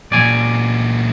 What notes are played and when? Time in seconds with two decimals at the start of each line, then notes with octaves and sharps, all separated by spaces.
0.12 A#2 F#3 D5 G#5